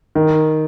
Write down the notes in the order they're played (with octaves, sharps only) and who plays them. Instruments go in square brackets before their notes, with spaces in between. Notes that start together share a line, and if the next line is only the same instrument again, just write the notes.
[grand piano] D#3